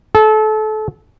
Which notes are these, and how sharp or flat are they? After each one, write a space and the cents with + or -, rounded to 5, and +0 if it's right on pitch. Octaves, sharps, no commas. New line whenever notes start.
A4 -30